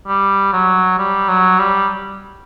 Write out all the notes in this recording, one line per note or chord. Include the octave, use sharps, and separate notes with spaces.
G3
F#3
G3
F#3
G3